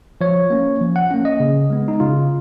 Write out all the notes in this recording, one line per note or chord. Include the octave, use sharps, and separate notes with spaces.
F3 C#5
A#3 C#4
F3
F#5
A#3 C#4
D#5
C#3
G#3 B3
D#4
C#3 F4